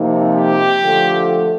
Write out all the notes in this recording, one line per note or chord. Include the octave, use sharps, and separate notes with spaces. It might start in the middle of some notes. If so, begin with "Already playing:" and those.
Already playing: C3 F3 A#3 D#4
G4
D3 F3 A3